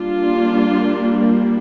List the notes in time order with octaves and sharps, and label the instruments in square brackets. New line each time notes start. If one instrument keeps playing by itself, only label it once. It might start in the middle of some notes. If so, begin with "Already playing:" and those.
Already playing: [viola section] G3 A#3 D4 F4